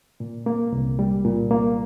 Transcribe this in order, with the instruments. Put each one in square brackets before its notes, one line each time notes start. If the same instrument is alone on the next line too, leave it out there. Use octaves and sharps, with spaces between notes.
[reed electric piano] A#2
A#3
C2
G3
A#2
A#3